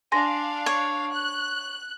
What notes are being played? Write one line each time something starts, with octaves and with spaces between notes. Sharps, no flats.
D4 F5 G#5 C6 A#6
C#5
F#6